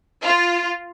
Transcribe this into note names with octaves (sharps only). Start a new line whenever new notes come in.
F4